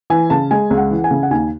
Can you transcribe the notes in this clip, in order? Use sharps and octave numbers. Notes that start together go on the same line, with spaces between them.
E3 G#5
C#3 A5
G#3 G#5
C#2
F#5
E3
G#5
C#3
F#5
D#2 G#5